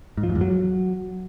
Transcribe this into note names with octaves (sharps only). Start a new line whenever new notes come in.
G#2
F3
F#2
E2
F#3